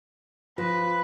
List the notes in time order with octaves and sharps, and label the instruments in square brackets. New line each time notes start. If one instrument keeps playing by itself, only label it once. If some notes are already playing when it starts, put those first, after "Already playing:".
[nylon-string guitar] F3 [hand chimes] F4 [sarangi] B4